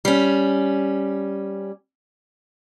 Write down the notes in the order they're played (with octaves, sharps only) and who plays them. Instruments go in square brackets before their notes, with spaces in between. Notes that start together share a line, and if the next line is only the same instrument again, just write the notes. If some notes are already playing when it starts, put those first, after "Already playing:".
[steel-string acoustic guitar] G3 C#4